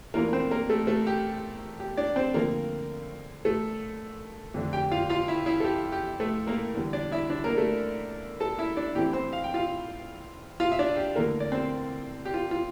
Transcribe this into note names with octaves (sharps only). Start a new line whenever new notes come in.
E2 E3 A3 A#3 D4 F4 A#4
C4 C5
A#3 A#4
A3 A4
A3 A4
G4
G4
D4 D5
C4 C5
D3 F3 A3 A#3 C4 A#4
A3 A4
F2 D3 A3 D4
G4 G5
F4 F5
F4 F5
E4 E5
E4 E5
A4
G4
G4
A3 A4
A#3 A#4
E2 D3 G3
D4 D5
E4 E5
D4 D5
A#3 A#4
A3 A4
A4 A5
E4 E5
D4 D5
A2 E3 A3 C4 E4 G4
C4 C5
F5
G5
F4 F5
F4 F5
E5
D4 D5
G4
E2 D3 A3 A#3 A#4
D5
C4 C5
G4
F4
F4